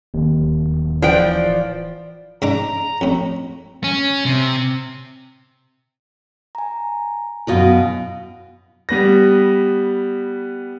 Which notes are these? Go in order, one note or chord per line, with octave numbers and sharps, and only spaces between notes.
D1 D#2
E3 F3 B4 D5 G5
G#2 D4 A#5 D6
F2 A2
C#4
C3
G#5 A#5
F#2 B2 E4 F#4 D#5 F5 B5
G3 B3 B4 A#6